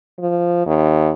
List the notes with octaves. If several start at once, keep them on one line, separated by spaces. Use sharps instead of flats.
F3
D#2